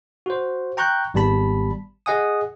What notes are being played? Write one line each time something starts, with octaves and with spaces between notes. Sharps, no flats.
F#4 C5
G5 A#5 C#6 F#6 G6
G#1 G3 B3 A5 B5
G#4 D#5 F#5 G#5 D#6